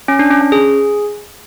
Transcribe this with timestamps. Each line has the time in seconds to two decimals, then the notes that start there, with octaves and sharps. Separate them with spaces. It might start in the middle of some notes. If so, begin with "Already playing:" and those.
0.08 C#4
0.19 D4
0.30 C#4
0.41 C#4
0.52 G#4